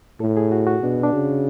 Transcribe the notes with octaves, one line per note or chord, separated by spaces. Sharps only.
A2 A4
G#4
F#4
F#4
B2 D4
D4
C#3